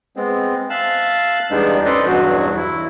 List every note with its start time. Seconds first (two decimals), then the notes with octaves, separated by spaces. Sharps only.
0.16 G#3 B3 C4
0.70 E5 F5 A5 F#6
1.51 E2 G3 G#3 B3 D4 D#4
1.85 C#4 A4 B4 C5 D5 D#5
2.07 E2 G2 B2 F#3 F#4
2.57 E4